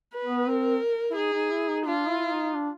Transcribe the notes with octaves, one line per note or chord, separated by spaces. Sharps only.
B4
B3
C4 A#4
E4
D#4 G#4
D#4
E4
D#4
D4 F4
E4
D#4
D4